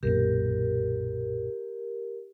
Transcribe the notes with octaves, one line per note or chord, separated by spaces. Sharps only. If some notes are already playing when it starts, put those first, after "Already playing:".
B1 F#2 A#2 G4 A#4